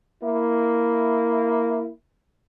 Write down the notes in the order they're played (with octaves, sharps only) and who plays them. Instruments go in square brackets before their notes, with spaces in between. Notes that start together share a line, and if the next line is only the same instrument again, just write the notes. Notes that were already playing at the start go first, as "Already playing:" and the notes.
[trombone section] A#3 E4